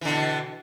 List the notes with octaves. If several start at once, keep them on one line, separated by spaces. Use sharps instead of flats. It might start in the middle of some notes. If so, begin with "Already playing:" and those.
B2 D3 E3